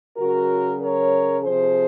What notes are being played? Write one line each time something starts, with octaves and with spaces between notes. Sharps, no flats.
C#3 F#3 F#4 A#4
A#4 C#5
C3 F3 G#4 C5